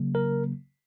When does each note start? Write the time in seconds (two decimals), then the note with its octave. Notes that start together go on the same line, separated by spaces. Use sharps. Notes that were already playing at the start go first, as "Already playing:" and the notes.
Already playing: C#3 F#3 A#3
0.15 A#4